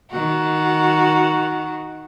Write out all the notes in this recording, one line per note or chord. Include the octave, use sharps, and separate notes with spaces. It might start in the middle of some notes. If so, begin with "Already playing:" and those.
D#3 F#4